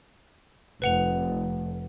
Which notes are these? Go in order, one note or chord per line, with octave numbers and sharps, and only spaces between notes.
F1 B4 F#5 F7